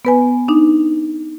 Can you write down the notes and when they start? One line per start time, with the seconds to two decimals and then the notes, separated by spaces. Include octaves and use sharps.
0.05 B3 B4 G#5
0.48 D4 D#4